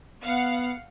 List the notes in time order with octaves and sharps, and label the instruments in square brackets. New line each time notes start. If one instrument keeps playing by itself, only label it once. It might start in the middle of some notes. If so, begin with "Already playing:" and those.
[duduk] B3 [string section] F5 F#5